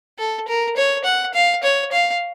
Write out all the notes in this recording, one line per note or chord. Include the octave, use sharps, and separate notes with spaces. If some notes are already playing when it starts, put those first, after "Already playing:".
A4
A#4
C#5
F#5
F5
C#5
F5